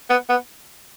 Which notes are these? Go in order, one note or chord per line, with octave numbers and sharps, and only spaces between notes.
B3
B3